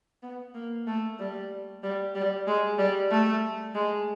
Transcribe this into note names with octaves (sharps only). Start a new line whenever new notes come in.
B3
A#3
A3
G3
G3
G3
G#3
G3
A3
G#3